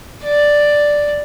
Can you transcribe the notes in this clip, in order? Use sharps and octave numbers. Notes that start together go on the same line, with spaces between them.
D5